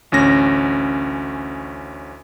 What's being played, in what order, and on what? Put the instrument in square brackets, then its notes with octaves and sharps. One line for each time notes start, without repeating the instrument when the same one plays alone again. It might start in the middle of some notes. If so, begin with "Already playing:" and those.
[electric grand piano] A1 D2 C#4 A#6